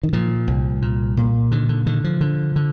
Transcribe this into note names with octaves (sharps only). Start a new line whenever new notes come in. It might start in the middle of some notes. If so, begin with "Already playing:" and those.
D#3
A#2 F3
C2
A#2
A#2
D3 D#3
D3
D3 D#3
F3
D3
D3